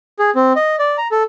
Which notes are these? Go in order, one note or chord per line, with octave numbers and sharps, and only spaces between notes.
G#4
C4
D#5
D5
A#5
A4